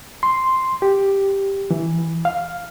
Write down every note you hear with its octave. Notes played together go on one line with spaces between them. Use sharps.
C6
G4
E3
F5